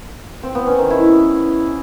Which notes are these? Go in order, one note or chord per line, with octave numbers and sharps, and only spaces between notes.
C4
B3
C#4
D#3
E4